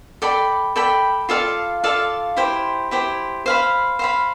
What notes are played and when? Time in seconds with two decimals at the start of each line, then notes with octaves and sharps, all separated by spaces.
0.22 A4 D5 G5 B5
0.76 A4 D5 G5 B5
1.29 F4 A4 D5 F5
1.84 F4 A4 D5 F5
2.37 E4 G4 C5
2.91 E4 G4 C5
3.46 C5 F5 B5
3.99 C5 F5 B5